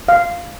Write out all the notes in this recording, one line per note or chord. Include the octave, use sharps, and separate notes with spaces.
F5